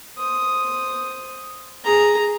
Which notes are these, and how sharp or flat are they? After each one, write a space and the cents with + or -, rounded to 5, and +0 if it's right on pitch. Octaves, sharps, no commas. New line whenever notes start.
C5 +0 D#6 +0
G#4 +0 A#5 +0